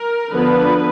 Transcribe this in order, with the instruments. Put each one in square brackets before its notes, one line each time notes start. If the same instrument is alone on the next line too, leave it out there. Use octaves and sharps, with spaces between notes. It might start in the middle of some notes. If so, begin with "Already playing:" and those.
Already playing: [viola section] A#4
D3 F3 B3 D4 B4